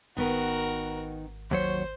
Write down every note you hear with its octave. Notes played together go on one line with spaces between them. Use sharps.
G#1 D#3 B3 F#4 A#4 B4
D#2 F#3 C5 C#5